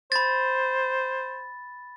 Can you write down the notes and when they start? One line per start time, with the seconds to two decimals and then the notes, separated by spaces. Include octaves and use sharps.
0.12 C5 B5 A6